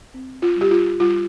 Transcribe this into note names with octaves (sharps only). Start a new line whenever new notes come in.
C4
F4
G3 G4
F4
G3 F4